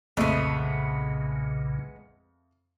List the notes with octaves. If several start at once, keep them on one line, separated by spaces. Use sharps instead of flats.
B1 F2 A#2 C#3 G#3 A3 B3